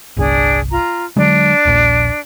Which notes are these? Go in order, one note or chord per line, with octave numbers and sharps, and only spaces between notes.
G1 C2 D4 G#4
F4 A#5
D3 F#3 G#3 D4
D#1 A#1